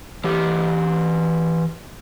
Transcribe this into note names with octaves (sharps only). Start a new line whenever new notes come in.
E3 G4